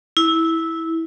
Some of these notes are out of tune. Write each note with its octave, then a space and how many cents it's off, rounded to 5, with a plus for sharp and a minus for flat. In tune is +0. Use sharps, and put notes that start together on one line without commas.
E4 -10